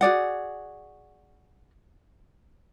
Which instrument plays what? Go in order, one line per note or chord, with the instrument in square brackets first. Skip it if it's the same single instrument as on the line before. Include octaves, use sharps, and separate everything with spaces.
[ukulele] F#4 G#4 D5 F#5